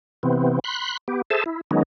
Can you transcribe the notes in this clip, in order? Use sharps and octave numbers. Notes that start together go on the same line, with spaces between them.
C3 E3 B3 C4
B5 C6 F#6
B3 G4
G#4 A4 C5 E5 A5
E4
D#3 F#3 G#3 B3 C#4 D#4